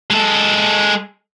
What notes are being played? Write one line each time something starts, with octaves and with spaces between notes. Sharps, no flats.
G#3 A4